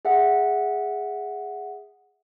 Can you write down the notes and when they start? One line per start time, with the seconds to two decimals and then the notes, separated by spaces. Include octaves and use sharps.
0.05 G#4 E5 F#5